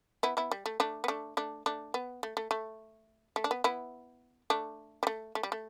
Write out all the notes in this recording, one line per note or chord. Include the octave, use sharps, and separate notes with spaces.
B3 E4
B3 E4
G3
A3
A3 D4
B3
A3 D4
A3 D4
A3 D4
B3
A3
A3
A3
A3
D4
B3
B3 E4
A3 D4
G3
A3
A3
G3
A3